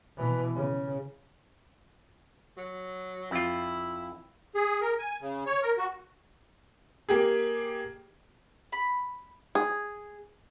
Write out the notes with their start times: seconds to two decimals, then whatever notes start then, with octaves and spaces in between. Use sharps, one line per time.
0.17 B2 E3
0.55 C#3
2.57 F#3
3.31 F2 E4 F4
4.55 G#4
4.81 A#4
4.99 G#5
5.21 C#3
5.46 C#5
5.63 A#4
5.78 F#4
7.09 A#3 G4 G#4
8.72 B5
9.55 G#4